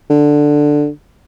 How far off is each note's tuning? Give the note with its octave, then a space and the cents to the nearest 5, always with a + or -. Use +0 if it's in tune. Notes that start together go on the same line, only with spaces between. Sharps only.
D3 +5